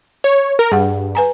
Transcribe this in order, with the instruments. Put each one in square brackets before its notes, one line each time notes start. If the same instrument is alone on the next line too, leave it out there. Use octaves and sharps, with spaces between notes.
[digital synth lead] C#5
A#4
[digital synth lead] G2 [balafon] G#4 F#5
[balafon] B4 G#5 A#5